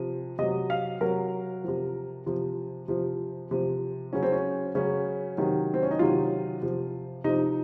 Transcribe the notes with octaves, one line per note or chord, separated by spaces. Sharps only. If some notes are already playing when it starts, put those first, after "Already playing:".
Already playing: C3 F3
C3 F#3 D#5
F5
C3 F#3 A#4
C3 F3
C3 F3
C3 F3
C3 F3
C#3 F#3 C#4
C4
C#4
C#3 F#3 C#4
C3 D#3 F#3
C4
C#4
D#4
C3 D#3 F#3 F4
C3 F3
C3 F3 D#4